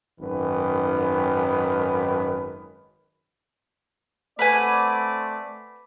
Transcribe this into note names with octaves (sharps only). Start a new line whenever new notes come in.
G#1 F#2 D#3 B4
A3 C4 B4 D5 F#5 G#5